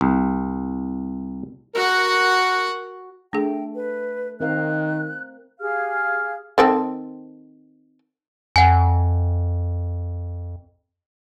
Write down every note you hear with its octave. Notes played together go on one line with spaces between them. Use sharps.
C2
F#4 A#4 F#5
A3 D4 G#4 G5
B4
D#3 C4 A#4 F5 F#6
G4 G#4 F5 F6
D#3 C4 A4
F2 F#5 G#5